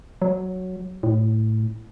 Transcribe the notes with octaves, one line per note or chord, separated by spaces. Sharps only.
F#3
A2